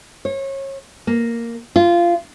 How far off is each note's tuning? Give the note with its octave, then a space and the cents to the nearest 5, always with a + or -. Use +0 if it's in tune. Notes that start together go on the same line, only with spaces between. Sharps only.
C#5 -30
A#3 -5
F4 -15